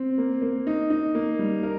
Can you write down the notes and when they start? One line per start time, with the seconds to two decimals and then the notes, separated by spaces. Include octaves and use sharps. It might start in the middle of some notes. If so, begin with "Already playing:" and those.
Already playing: C4
0.18 A#3
0.42 A#3
0.67 D#4
0.90 D#4
1.15 A#3
1.39 G3
1.63 A#4